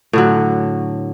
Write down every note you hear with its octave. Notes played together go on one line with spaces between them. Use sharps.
A2 D3 F#3